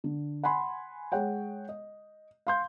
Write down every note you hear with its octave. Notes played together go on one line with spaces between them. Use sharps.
D3
F#5 G#5 B5 C6
G#3 C#5 F#5 G5
D#5
F5 C6 G6